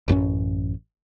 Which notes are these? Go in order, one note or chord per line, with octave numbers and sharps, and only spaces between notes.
A1 F#2 B3 C#4